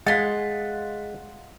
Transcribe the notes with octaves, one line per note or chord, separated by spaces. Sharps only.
G#3 F4 F#5 A6 B6